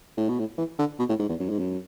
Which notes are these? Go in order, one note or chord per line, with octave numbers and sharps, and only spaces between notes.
A2
B2
A2
E3
D3
B2
A2
G#2
E2
F#2
G#2
F#2